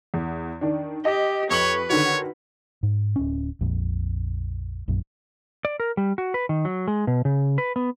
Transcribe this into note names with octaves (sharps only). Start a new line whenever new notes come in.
E2
D#3 D4
G4 D#5
F2 B4 C#5 C#6 F#7
D3 D#3 F#4 C#5
G#2
D1 C#4
A#1 F2 A#2
A#1 F#2
D5
A#4
G3
F#4
B4
D#3
F#3
G#3
B2
C#3
B4
B3